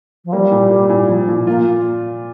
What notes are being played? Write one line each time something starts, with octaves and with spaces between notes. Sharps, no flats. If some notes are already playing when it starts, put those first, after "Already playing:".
F3
G3 A#3
A#2
A#3
A#2
F3
A#2
A#3 F4